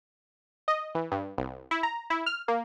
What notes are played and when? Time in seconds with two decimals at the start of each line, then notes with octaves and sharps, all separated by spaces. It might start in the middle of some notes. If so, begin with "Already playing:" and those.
0.68 D#5
0.95 E3
1.12 G2
1.38 C2
1.71 E4
1.83 A#5
2.10 E4
2.26 F6
2.48 A#3